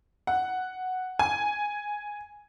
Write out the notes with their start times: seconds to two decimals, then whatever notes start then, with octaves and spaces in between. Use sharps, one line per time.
0.27 F#5
1.19 G#5